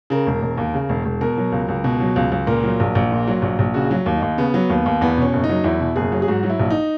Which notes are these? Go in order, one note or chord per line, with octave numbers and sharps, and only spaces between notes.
C#3 A#4
E1
E1
D#2
C#3
E1
E1
B2 A#4
F#3
C#2
C#2
B2
F#3
C#2
C#2
A#2 A#4
F#3
A#1
A#1
A#2
F#3
A#1
A#1
C#3 F#4
F#3
D#2
D#4
D#2
C#3 B3
F#3
D#2
D#2
E2 B3
B2 C#4
F#1
D#4
F#3
E2 E4
B2
F#1 G#4
F#3
G#4
G#2 F#4
F#3
E4
A#1
D#4